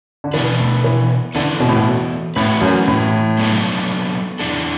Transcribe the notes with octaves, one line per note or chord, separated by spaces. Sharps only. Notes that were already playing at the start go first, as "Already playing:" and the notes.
D3
B2 E3 B3 D4 B4
A3
E3
D3 E3 B3 E4 A4
B2
A2
B2
A2 E3 A3 F#4 B4
F#2
A2
F#3 B3 D4 A4
E2 E3 D4 A4